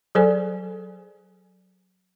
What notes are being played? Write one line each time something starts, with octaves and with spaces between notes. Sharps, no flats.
F#3 G#4 A4 C5 D5 G#5